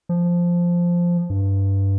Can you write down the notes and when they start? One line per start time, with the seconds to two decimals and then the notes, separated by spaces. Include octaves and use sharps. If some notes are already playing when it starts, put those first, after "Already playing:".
0.09 F3
1.30 G2